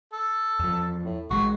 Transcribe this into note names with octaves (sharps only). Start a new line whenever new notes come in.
A4
E2 F3
A2
A1 G#3 F#4